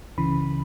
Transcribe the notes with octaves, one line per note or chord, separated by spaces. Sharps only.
C#2 C#3 E3 B5